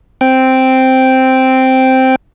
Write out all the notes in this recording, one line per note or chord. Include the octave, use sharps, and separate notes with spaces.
C4 G5